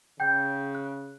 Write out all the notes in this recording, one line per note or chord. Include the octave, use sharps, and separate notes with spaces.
C#3 G5 G6
F#6